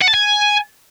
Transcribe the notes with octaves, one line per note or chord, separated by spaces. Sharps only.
F#5
A5
G#5